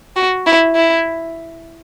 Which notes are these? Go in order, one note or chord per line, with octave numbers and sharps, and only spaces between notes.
F#4
E4
E4